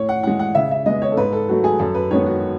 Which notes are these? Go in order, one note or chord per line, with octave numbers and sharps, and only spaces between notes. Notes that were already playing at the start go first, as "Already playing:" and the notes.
Already playing: A2 C#5
F#5
E3 G#3 F#5
F#5
C#3 E5
E5
G#3 B3 D#5
C#5
A4
G#2 B4
A4
F#3 A3 F#4
G#4
F#2 A4
B4
D#3 G#3 B3 C#5
F#4